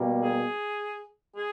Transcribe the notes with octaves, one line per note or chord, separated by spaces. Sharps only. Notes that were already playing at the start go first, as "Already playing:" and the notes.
Already playing: B2 G3 A#3
G#4
G#4